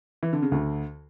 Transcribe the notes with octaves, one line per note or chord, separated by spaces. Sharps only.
E3
D3
C#3
D2 D3